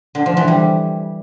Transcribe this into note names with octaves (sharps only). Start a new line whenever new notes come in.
D3
F3
E3
G3